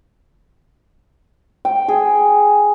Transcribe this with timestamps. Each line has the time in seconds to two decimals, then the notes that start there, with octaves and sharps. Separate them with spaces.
1.65 G5
1.88 G#4